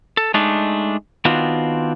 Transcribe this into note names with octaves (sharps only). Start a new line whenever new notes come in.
A4
G#3 A3 D4 D#4
D#3 B3 C4 D4 F4 F#4